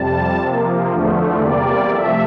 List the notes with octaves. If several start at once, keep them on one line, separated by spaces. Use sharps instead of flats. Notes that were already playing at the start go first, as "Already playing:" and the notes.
Already playing: F2 C3 G3 A5
C3 F3 A#3
E2 D3 F3 A3
E2 C3 G3 A#3 D5
C3 F3 A3 E5